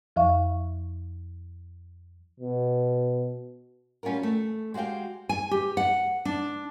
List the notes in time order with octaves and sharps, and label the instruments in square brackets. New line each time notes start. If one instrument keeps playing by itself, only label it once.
[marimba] F2 F3 E5 F5 C#6
[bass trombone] B2
[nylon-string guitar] G3 C#4 F4 F#4 A#4
A3
G#3 F#4 G4 F5 G5
G#5
G4
F#5
D4